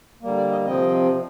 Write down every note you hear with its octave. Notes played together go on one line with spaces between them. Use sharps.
D3 G3 A#3
D5
D#5
C3 F3 C4 D#5